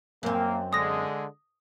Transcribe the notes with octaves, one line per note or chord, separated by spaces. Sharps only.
F#2 A#3 C4
D3 G#3 D#6 A#6